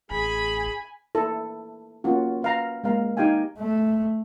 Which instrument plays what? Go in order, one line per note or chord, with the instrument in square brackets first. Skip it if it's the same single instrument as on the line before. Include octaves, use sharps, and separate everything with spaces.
[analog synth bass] A1 [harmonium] G#4 [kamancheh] G#5 [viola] B5
[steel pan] A#3 E4 A4
A#3 C#4 F4 F#4
B4 F5 A#5
G#3 A#3 F5 A#5
D#4 G4 F5 G5 G#5
[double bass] A3